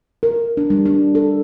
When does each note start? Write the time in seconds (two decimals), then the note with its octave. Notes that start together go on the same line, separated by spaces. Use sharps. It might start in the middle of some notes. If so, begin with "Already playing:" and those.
0.23 A#4
0.57 D4
0.70 G3
0.86 D4
1.15 A4